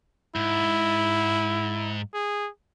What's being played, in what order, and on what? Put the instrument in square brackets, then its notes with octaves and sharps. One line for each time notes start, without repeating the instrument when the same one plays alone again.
[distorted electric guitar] G#2 [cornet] E4
[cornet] G#4